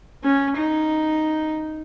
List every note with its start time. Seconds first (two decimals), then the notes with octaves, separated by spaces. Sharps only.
0.24 C#4
0.57 D#4